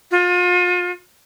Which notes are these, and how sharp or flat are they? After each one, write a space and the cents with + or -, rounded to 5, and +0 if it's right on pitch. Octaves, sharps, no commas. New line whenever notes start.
F4 +35